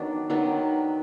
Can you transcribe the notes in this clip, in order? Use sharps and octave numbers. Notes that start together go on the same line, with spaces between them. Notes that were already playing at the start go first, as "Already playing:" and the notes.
Already playing: D#3 F#3 B3 D4
D#3 F#3 B3 D4